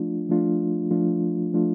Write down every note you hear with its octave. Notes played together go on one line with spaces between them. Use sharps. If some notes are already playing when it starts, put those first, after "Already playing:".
Already playing: F3 A3 D4 F4
F3 A3 D4 F4
F3 A3 D4 F4
F3 A3 D4 F4